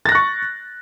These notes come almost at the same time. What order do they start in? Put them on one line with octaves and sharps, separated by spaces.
A6 A#6 F#6 C#6